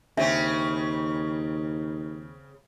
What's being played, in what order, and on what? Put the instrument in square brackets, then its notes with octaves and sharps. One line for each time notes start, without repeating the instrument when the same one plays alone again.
[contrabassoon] D#2 [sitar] C#3 C4 [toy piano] D4 D#4 E5